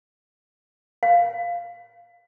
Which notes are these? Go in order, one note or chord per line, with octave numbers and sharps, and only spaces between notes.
F5